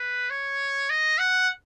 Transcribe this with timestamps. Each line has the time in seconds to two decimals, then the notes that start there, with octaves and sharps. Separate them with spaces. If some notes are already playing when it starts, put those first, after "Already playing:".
Already playing: B4
0.30 C#5
0.90 D#5
1.19 F#5